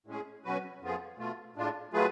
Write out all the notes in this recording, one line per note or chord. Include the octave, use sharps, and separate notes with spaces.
A2 G#3 C#4 G#4
B2 F#3 C#4 F#4 B4
F2 F3 B3 F4 G#4
B2 A3 F4
A2 G#3 D4 F4
F#3 A3 F4 G#4 B4